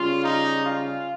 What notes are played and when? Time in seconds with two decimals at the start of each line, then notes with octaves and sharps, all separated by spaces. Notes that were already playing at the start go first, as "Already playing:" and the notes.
Already playing: C#3 G3 C#4 F4
0.24 D#4
0.65 F4